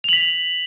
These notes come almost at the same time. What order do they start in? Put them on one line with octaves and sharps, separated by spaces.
F7 F#7 B6